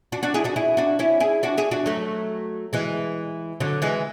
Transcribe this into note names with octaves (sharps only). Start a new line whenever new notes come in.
D4 F#4
D4 F#4
E4 G#4
D4 F#4
E4 G#4
D4 F#4
C#4 E4
E4 G#4
D4 F#4
E4 G#4
D4 F#4
F#3 A3
E3 G#3
D3 F#3
E3 G#3